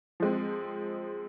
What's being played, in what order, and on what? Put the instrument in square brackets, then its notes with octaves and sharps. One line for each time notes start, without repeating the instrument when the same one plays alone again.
[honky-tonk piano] F3 G#3 C4